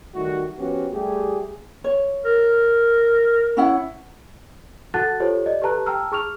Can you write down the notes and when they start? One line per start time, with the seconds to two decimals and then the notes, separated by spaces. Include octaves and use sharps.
0.14 D#3 G3 A3 F#4
0.58 F3 B3 C#4 F#4 G4
0.93 G3 A3 G4 G#4
1.84 C#5
2.25 A#4
3.57 C#4 E4 F#5
4.94 F#4 A4 F#5 A5 F#6 A6
5.20 F4 G4 A4 C5 C#5
5.46 D5 D#5
5.62 G4 A4 B4 A5 A#5 F#6
5.86 G5 A5 A#5 E6 F6
6.12 G#4 C#6 F6 F7